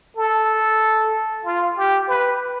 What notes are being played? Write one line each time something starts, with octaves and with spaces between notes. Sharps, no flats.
A4
F4
G4
B4